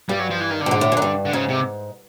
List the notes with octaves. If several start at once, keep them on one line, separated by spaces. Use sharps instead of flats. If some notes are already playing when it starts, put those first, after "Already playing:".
G2 G3
F#3
F3
E3
D#3
D3
G2
G#2
A2
G#2
F#2
G2
D3
G#2 C#3
C3